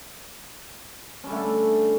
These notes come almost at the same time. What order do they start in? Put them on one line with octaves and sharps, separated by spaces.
C#4 G3 D3 A3